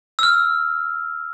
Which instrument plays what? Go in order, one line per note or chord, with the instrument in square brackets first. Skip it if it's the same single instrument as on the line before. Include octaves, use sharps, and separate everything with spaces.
[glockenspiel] E6 F6